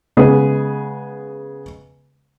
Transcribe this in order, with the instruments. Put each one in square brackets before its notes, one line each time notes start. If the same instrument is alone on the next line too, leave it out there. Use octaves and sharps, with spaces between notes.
[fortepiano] C#3 G#3 B3 G#4